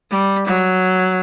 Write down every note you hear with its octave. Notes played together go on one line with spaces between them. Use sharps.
G3
F#3